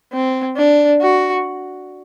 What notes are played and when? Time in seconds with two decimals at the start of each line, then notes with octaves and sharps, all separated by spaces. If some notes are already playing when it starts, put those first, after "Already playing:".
0.13 C4
0.57 D4
1.01 F#4